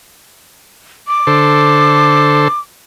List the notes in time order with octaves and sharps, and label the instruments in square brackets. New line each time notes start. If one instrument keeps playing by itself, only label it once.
[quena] D6
[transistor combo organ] D3 A4 C5